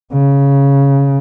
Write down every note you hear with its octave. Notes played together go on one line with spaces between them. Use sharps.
C#3